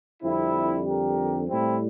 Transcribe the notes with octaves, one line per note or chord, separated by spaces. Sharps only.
F2 D3 G3 C4 E4
G4 A#4
A2 G3 C4 E4